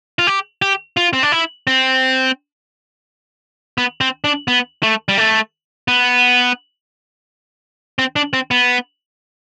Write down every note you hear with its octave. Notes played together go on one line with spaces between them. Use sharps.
F4
G4
G4
F4
C4
D4
E4
C4
B3
C4
D4
B3
A3
G3
A3
B3
C4
D4
C4
B3